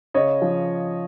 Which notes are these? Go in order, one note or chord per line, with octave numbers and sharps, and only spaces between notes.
C#3 C#5 D#5
F3